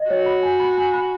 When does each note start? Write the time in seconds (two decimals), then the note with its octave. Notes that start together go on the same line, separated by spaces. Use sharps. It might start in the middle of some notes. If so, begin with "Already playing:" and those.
Already playing: D#5
0.10 F#4 C#5
0.26 B5
0.43 G#5
0.60 B5
0.77 G#5
0.94 B5